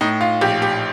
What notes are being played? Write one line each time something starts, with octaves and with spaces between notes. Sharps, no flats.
A2 D#4
F4
A#1 G4
G4